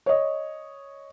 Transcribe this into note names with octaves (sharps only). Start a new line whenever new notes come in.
C#5 D#5